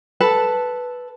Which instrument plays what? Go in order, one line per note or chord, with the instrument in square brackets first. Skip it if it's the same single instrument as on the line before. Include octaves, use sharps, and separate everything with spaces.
[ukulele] A4 B4 A5